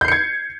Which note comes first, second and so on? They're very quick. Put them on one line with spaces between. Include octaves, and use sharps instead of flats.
G6 C7 C#7 G#6